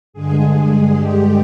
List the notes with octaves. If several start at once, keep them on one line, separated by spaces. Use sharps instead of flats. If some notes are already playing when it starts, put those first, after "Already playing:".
G2 D3 G#3 G#4
G4